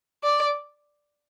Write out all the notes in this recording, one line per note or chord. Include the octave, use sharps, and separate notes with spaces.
D5